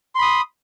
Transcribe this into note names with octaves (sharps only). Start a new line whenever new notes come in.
B5 C6 D#6